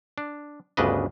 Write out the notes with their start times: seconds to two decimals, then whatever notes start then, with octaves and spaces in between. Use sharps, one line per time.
0.18 D4
0.77 G1 D2 C#3 D4 B4 D#5